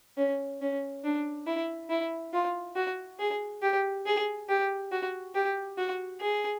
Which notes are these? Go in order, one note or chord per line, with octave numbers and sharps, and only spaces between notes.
C#4
C#4
D4
E4
E4
F4
F#4
G#4
G4
G#4
G4
F#4
G4
F#4
G#4